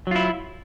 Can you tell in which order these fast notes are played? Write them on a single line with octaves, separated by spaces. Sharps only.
F#3 F4 E4